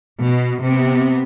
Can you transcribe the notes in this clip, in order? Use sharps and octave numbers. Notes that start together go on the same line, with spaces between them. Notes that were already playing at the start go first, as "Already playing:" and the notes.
B2
C3 B3